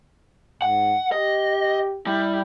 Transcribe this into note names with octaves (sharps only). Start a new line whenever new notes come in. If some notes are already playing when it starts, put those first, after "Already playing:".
G#2 F#5
G4 D#5
G3 E4